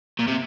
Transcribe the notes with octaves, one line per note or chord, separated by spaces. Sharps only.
A#2
C3